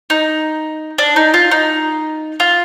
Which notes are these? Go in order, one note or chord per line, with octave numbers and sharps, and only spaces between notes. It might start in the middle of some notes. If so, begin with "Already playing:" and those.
D#4
D4
D#4
F4
D#4
F4